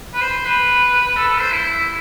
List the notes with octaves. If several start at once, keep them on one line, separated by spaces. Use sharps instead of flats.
B4
C5
B4
B4
A4
A4
C5
E4
E4